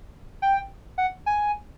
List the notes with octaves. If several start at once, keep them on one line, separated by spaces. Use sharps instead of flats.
G5
F#5
G#5